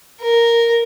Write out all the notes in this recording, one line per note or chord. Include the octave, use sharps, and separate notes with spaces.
A#4